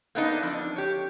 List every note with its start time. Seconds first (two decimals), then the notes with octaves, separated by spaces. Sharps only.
0.15 A#3 B3 D4 D#4
0.43 F2 D4
0.76 G4 C#5